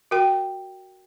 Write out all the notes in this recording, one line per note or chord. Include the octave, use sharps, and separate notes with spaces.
F#4 A#4 G5